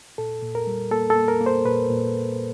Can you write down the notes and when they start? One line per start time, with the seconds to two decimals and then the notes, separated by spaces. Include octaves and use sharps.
0.18 A#2 A4
0.43 A#2
0.55 A#4
0.67 G3
0.91 A#3 A4
1.10 A4
1.16 A#3
1.28 A#4
1.41 A#3
1.46 C5
1.66 A#2 B4
1.90 A#2